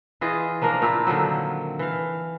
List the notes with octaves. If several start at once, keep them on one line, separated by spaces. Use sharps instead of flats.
E3 F4 G#4 D#5
F3 A#3 D4 A#4
A#2 C4 E4 F4
D3 D#3 F3 F#3
E3 F5